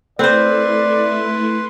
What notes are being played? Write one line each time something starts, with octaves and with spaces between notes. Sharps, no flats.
A3 C4 E4 B4 C5 D5 C6